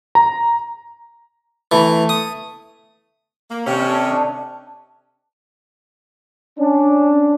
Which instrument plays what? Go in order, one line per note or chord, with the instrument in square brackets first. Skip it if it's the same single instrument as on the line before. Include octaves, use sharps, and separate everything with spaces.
[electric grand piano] A#5
[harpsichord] E3 [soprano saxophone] A3
[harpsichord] D#6
[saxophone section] A#3
[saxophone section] C3 C#4 [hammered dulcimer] C#5 D5
[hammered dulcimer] A4 C5 E5
D4 D#5
[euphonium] C#4 [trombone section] D4